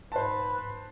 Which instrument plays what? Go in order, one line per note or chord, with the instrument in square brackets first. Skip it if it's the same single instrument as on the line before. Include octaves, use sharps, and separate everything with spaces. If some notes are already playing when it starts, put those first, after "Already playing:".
[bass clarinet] G#2 [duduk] B4 [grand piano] C5 A5